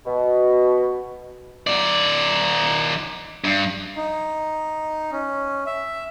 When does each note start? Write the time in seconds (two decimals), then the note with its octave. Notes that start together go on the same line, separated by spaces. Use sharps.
0.06 B2
1.67 D#3 D5
3.44 G2
3.96 D#4
5.12 C#4
5.66 E5